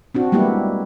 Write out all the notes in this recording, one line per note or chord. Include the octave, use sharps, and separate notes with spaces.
C4 D4 F#4
G3 G#3 A#3 B3 E4 G4